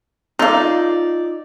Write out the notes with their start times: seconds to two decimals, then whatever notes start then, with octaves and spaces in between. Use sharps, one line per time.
0.39 D#4 F4 A4 D5 F5